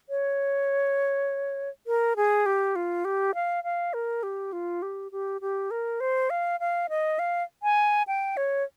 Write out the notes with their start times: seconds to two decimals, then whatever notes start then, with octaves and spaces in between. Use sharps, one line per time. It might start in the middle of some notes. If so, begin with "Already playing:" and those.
0.09 C#5
1.87 A#4
2.16 G#4
2.46 G4
2.76 F4
3.05 G4
3.35 F5
3.64 F5
3.94 A#4
4.23 G4
4.53 F4
4.82 G4
5.12 G4
5.41 G4
5.71 A#4
6.00 C5
6.30 F5
6.60 F5
6.89 D#5
7.19 F5
7.63 G#5
8.07 G5
8.37 C#5